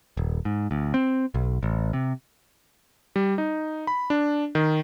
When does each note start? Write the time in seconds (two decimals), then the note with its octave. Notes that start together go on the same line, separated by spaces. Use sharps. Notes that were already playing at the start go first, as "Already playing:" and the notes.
0.17 D#1
0.45 G#2
0.71 D2
0.94 C4
1.34 B1
1.63 A1
1.93 C3
3.16 G3
3.38 D#4
3.87 B5
4.10 D4
4.55 D#3